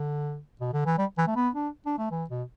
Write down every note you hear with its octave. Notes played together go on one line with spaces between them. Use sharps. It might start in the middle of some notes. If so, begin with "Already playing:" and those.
Already playing: D3
B2
D3
E3
G3
E3
A3
B3
D4
D4
A3
E3
B2